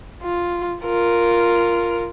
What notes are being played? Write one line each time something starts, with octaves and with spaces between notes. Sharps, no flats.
F4
F4 A#4